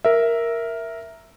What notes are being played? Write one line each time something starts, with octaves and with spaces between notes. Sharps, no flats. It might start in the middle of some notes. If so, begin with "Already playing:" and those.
A#4 E5